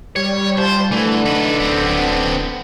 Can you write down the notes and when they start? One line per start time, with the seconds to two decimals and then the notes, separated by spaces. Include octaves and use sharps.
0.16 G3 C#5
0.58 F4 C5 G#5 A5
0.91 D3 E3 A3
1.26 D#4 B4
1.60 D1 B3 C4